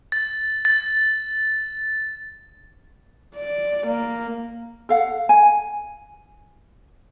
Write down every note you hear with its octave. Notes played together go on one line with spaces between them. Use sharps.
A6
A6
D5
A#3
A4 F5 F#5
G#5